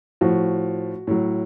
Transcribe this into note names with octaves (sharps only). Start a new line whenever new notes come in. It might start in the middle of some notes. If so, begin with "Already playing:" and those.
A2 F3 F#4
A2 F#3